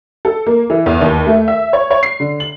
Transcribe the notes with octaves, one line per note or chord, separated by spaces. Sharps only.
A4
A#3
E3
E2
D#2
A3
E5
C#5
C#5
C7
D3
F#7